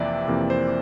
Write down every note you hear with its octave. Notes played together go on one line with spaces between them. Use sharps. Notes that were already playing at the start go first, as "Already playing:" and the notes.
Already playing: F2 C3 E3 A#3 D5 E5
F2 C3 E3 A#3
C5